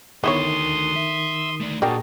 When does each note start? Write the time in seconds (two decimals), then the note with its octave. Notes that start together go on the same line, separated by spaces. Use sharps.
0.24 D3 D#3 A3 B3 E4 C#5 C6 D#6
0.96 E5
1.60 A3 D4
1.82 A#2 D4 F#4 G#4 A#4 G5 A5